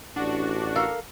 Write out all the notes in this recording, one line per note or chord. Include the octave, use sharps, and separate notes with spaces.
A1 D4 F#4
A4 A#4 F5